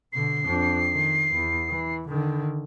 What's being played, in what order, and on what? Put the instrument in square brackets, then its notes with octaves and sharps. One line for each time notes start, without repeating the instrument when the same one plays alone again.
[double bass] B2 D3 [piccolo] C7
[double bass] F2 D4
D#3
E2
E3
D3 D#3